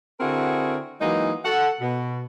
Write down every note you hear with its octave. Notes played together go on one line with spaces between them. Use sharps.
D3 C4 E4 F#4 G#4 A#4
E3 F#3 G#3 A#3 D#4
A4 F#5
B2